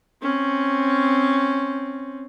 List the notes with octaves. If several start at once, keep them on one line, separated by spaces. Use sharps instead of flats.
C4 C#4